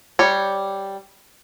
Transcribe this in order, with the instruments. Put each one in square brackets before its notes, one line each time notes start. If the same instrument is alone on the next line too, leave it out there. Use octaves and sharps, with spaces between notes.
[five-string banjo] G3 C#5